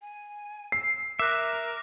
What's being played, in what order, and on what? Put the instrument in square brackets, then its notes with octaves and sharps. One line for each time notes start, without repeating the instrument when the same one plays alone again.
[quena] G#5
[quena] E6 [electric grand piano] C7
[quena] A#4 [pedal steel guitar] E5 [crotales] D6 F#6